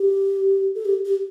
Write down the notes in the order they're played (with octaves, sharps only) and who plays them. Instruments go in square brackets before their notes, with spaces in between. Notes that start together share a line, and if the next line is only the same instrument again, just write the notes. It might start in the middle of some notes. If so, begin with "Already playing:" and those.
Already playing: [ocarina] G4
A4
G4
G4